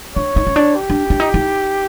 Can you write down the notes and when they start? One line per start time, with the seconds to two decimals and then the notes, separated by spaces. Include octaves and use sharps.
0.16 D4 C#5
0.36 D#4
0.47 C#4
0.56 D4
0.76 G4
0.90 D4
1.10 D4
1.20 D#4
1.34 D#4